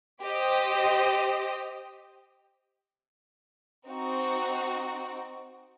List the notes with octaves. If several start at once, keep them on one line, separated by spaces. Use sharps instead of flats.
G4 C5 D#5
C4 D#4 F#4